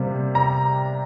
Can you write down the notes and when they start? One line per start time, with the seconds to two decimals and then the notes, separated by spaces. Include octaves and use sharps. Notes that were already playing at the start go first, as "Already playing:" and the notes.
Already playing: C3 G3 A#3
0.35 A#5